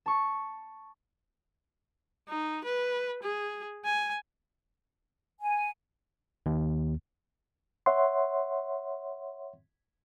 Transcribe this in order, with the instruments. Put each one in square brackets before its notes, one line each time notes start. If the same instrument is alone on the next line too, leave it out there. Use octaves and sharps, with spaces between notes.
[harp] A5 C#6
[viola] D#4
B4
G#4
G#5
[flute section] G#5
[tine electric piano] D#2
[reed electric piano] C#5 E5 F#5 C6